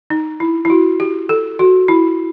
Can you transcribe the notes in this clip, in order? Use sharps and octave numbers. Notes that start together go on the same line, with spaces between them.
D#4
E4
E4
F#4
G4
A4
F#4
E4